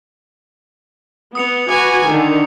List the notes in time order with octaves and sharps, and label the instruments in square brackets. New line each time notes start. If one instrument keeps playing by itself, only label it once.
[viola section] B3 [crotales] D#6 C#7 F7
[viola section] F#4 B4 G#5 [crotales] D6 C#7 F7
[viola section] D3 D#3